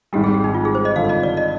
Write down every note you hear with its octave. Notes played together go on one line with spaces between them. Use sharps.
G#1 G#2 G3 G4
G#4
G4
D#4
F4
G#4
C5
D#5
G#1 G2 D3 F3 F5
D#5
D5
D#5